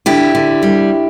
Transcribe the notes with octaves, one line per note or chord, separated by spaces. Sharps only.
D3 E4 G4
D3
G3